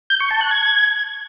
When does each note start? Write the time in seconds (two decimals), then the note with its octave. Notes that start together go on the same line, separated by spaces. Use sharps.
0.10 G6
0.20 C#6
0.31 A5
0.41 F#6
0.51 G#6